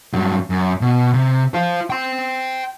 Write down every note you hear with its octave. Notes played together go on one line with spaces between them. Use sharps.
G2 F#3
F#2
B2
C3
F4 C5
G5 C6